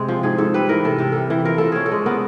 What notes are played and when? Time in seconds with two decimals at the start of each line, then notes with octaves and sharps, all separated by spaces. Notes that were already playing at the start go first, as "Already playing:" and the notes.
Already playing: C3 G#3 C4 G4
0.08 F3
0.23 G#2 G#4
0.38 G#2 A4
0.54 G3 B4
0.69 E3 A#4
0.84 C3 A4
0.98 C3 A#4
1.12 G3 A4
1.30 E3
1.45 F3 A#4
1.58 F3 A4
1.72 C#4 G#4
1.86 A4
1.91 G#3
2.06 B3 A#4